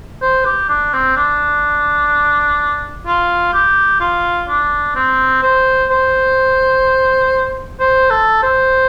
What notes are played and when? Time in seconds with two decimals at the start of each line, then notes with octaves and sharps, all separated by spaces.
0.22 C5
0.45 G4
0.69 D4
0.94 C4
1.17 D4
3.07 F4
3.54 G4
4.01 F4
4.48 D4
4.96 C4
5.43 C5
5.90 C5
7.80 C5
8.11 A4
8.43 C5